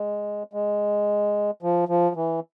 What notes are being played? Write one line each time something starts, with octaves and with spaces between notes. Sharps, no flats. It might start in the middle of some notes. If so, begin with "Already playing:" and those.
Already playing: G#3
G#3
F3
F3
E3